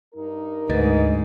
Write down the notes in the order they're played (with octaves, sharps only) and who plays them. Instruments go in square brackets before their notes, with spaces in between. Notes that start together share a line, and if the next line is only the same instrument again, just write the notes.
[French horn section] G2 D#4 A#4
[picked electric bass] D2 [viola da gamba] G#2 [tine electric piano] B4 D#5 A6